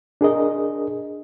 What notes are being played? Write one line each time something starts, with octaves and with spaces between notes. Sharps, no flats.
D4 G#4 A#4 D#5